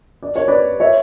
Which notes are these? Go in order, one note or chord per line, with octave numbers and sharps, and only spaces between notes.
D5
C#5
B4 D5
C#5 E5